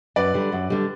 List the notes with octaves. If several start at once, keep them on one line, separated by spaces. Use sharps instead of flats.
F#2 B4 D5
D3 G3
F#2
D3 G3